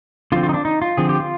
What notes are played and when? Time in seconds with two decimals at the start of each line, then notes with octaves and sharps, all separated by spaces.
0.32 D3 F3 C4 F4
0.43 F4
0.49 D#4
0.54 D4
0.65 D#4
0.82 F4
0.97 D3 F3 C4 G#4
1.09 G4
1.20 F4